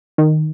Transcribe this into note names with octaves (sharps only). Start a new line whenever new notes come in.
D#3